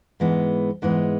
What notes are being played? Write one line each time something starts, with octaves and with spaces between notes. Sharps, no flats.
G#2 E3 G#3 B3
G#2 E3 G#3 B3